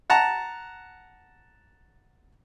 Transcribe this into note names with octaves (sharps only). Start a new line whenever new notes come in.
F#5 A5 A#5